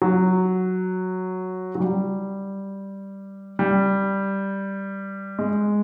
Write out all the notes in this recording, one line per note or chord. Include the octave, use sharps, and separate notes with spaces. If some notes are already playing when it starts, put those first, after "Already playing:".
F#3
F#3
G3
G3
G#3